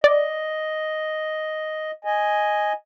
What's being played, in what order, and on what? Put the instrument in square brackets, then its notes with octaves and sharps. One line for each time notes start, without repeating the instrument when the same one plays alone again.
[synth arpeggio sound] D5 [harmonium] D#5
[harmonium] D#5 G#5